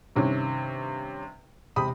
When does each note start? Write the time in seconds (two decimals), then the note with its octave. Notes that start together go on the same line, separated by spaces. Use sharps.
0.16 G2 C3 D#3 C#4
1.76 E1 C3 G4 B5 D#6